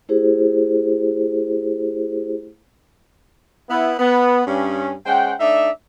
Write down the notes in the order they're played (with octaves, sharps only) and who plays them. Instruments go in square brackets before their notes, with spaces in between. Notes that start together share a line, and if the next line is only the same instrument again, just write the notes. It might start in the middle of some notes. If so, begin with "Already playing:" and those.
[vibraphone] A3 E4 G4 G#4 C5
[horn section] B3 E4
B3
G2 C#4
G#3 C#4 C5 F#5 G5
A3 D4 D#4 D5 E5